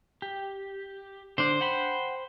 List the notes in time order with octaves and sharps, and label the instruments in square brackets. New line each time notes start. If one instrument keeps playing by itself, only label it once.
[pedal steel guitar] G4
[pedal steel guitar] D3 D4 [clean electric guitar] C5
[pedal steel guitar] F#5 G5 B5